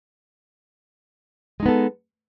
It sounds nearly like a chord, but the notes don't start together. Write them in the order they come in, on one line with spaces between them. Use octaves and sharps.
G#3 D#4 B3 A4